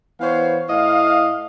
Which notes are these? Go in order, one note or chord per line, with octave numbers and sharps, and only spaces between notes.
E3 B3 C5 C#5 F5
A2 E4 D#5 F5